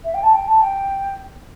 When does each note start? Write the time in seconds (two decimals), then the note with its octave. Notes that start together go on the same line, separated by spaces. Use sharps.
0.04 E5
0.14 G5
0.23 A5
0.33 G5
0.48 A5
0.62 G5